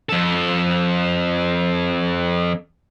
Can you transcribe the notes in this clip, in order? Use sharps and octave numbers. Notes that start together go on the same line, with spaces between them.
F2 A4